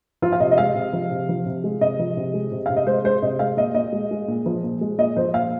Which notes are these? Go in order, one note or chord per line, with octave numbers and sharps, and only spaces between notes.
F3 F4
F5
C3 D#5
D#5
G#3 F5
C3
F3
C3
F3
C3
G#3
C3 D#5
F3
C3
G#3
C3
C3 F5
D#5
G#3 C5
G#3 C5
C3 D#5
G#3 F5
A#2 D#5
A#2 D#5
G#3
G#3
A#2
F3
A#2
G#3
A#2 D#5
F3 C5
A#2 F5